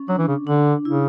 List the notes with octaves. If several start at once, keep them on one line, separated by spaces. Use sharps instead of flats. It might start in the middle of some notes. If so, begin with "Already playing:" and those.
Already playing: C#4
F#3 D4
E3
C#3
D3 D4
C#3 E4